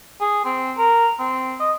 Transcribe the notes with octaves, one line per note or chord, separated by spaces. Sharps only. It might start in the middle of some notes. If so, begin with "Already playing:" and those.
G#4
C4
A#4
C4
D#5